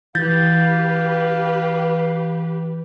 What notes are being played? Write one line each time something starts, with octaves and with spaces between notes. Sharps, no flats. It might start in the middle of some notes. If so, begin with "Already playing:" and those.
E3 G4 B4 F5 G6 A6